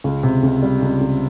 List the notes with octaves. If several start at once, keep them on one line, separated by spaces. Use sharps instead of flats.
C#2
C3
C#2
G3
C#2
C#2